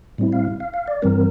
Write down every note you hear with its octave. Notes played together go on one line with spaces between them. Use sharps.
A2 G3 C4 E4
F5
F5
F5
D5
G2 E3 G3 C4 A#4